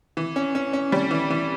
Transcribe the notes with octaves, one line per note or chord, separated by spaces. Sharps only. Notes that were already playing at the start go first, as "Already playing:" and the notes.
E3
C#4
C#4
C#4
G3
E3
E3